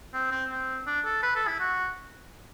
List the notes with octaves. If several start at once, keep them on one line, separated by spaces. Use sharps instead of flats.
C4
C4
C4
D4
A4
B4
A4
E4
F#4